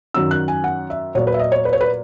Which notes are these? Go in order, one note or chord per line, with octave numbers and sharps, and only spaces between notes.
F#2 D#3 F#3 E6
F#6
G#5
F#5
E5
A#2 F#3 C#5
B4
E5
D#5
C#5
B4
C#5
B4